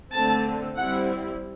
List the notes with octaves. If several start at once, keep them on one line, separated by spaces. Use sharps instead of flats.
D3 A3 C4 A5
G3 C4 E4 F#5